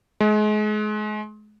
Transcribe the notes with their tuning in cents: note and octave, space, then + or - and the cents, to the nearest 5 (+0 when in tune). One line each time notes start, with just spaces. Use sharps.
G#3 +35